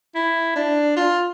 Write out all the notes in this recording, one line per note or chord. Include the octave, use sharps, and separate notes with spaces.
E4
D4
F4